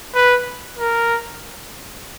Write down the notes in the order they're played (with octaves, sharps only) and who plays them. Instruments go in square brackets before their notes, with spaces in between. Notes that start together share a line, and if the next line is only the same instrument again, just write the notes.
[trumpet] B4
A#4